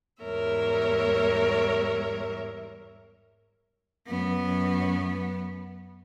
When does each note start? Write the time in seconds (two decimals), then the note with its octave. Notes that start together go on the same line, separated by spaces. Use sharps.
0.21 E2 G#2 G3 A#4 C#5 E5
4.08 F#2 B3